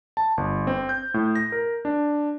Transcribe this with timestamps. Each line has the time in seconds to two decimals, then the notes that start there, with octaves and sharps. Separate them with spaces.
0.17 A5
0.37 G1
0.67 C4
0.89 G6
1.14 A2
1.36 A#6
1.52 A#4
1.85 D4